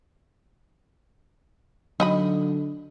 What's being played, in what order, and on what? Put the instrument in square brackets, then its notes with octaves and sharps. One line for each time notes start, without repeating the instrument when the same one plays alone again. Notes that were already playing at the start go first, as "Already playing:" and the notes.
[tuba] D3 [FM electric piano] F#3 [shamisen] D#4 D#5 B5